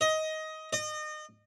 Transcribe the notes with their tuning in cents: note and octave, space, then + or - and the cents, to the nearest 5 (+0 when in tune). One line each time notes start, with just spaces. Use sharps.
D#5 +15
D#5 -30